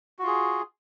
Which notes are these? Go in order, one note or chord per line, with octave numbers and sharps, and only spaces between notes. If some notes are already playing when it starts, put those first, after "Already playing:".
F4 F#4 G#4